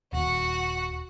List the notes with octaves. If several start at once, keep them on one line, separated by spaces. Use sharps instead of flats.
D#1 F#4 F#5